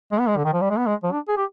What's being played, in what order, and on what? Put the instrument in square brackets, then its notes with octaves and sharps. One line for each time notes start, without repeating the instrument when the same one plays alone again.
[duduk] G#3
B3
G#3
D3
D#3
F3
G3
G#3
B3
G#3
F3
D4
G#4
G4